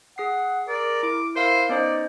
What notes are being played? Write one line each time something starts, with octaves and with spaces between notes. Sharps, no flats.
G#4 F#5 D#6 C7
A#4 D5
E4 D6
E4 A#4 C5 F5
B3 C#4 D#4 C5 D5